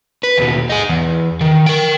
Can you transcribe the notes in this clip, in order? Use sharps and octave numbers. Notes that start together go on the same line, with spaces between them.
B4
D#2 B2
D#4 G#4
E2
D#3
A#4 G5